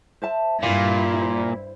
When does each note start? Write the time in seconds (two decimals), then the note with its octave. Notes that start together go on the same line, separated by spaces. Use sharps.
0.22 C5 E5 A5
0.63 G2 A#2 E4 F5
1.22 C5